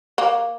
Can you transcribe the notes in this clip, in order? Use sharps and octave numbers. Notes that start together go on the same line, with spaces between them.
A#3